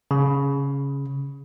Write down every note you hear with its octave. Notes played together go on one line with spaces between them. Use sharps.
C#3